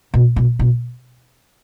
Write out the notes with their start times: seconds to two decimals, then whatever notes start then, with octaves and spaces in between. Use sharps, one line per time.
0.14 B2
0.36 B2
0.59 B2